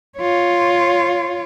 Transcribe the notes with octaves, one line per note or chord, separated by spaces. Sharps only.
F4 C#5